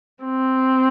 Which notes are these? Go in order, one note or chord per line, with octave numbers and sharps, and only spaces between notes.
C4